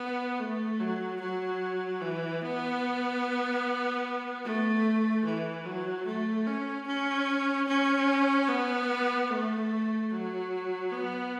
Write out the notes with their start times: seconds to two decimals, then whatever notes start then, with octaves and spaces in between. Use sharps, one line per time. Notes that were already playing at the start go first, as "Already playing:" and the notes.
Already playing: B3
0.39 A3
0.80 F#3
1.20 F#3
2.01 E3
2.41 B3
4.44 A3
5.25 E3
5.66 F#3
6.06 A3
6.47 C#4
6.87 C#4
7.68 C#4
8.49 B3
9.30 A3
10.11 F#3
10.92 B3